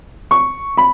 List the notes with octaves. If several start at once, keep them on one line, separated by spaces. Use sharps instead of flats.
C#6
B5